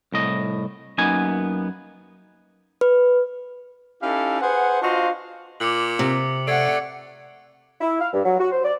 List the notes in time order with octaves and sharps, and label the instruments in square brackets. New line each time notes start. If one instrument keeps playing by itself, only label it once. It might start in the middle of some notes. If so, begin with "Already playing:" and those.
[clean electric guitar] C2 A2 D#5
F#2 A#3 B3 D#4 G#5
[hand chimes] B4
[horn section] C#4 D#4 E4 G4 A4 F5
G#4 B4 C5 F#5
D4 F4 F#4 C5 D#5 F5
[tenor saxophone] A#2 [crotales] D6 C#7 F#7
[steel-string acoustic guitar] C3
[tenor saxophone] A3 [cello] D5 F#5 [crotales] G#6 C7 D7
[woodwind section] E4
F5
G2
F#3
F#4
C5
D5